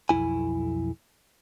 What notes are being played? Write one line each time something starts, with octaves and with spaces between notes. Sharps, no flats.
B1 F2 C#3 E4 G#5